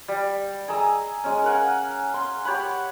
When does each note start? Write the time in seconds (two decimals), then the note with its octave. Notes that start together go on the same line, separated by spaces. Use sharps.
0.08 G3
0.68 G#4 D#5 A#5 E6
1.24 G#3 C#4
1.44 A#4 F5 F#5 G#5
2.14 C6
2.45 G4 C#5 F#5 B5